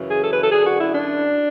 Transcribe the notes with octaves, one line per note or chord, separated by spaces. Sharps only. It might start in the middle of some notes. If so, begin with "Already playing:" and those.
Already playing: F#2 C#3 E3
G#4
A4
B4
A4
F#2 D3 G#4
F#4
E4
D4